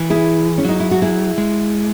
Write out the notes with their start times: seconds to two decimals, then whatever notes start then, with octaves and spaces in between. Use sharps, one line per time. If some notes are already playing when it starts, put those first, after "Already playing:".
Already playing: E3
0.10 E4 G#4
0.58 C#4
0.65 F#3 D#4
0.80 E4
0.91 F#4
1.02 E4 G#4
1.38 G#3